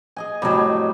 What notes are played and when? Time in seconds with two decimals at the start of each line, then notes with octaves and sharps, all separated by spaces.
0.17 G#4 D#5 G#5
0.42 F2 A2 F#3 G3